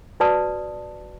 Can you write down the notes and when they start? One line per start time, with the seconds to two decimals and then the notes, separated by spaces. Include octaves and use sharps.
0.20 F#4 B4 D5 A5 C6 D#6